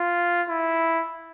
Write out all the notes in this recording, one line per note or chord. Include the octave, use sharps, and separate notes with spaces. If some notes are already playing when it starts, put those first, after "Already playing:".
Already playing: F4
E4